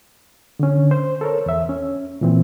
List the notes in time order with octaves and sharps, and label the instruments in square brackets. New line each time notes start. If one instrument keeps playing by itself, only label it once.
[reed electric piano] D3 C#4
C5
A4 A#4 C#5
E2 E5
C#4
A#2 E3 C4